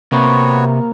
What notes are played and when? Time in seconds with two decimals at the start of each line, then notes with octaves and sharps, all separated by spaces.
0.12 C3 A#3 B3 F#4 C#5